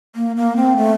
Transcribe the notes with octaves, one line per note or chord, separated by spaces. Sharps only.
A#3
A#3
C4
A3